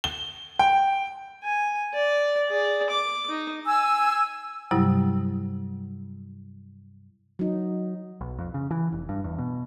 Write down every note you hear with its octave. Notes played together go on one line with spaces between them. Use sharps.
G7
G5
G#5
D5
G#4 D5
D6
D#4
G#5 E6
G2 C3 F#3 G3 E4
F#3 D#4
B1
F2
C#3
E3
F1
G2
E2
B2